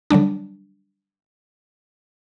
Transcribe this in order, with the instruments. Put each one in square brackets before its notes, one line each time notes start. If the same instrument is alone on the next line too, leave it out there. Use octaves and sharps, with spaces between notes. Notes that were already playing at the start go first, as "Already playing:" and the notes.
[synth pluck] D3 F#3 G3 D4